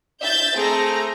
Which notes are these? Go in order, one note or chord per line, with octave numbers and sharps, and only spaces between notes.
E5 G6 A6
A3 C4 G#4 A#5